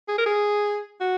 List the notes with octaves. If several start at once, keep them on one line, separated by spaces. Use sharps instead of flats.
G#4
A#4
G#4
F#4